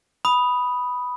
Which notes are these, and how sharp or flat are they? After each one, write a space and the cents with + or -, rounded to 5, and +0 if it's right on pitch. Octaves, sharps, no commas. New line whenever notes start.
B5 +0 D#6 +0